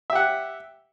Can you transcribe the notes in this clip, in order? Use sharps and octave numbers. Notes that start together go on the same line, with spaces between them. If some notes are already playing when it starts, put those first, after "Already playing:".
G4 E5 F#5